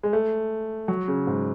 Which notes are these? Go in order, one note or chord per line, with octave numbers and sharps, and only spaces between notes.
G#3
A3
F#3
C#3
G#2